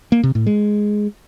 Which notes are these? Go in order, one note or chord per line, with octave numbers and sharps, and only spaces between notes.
A#3
C3
A2
G#3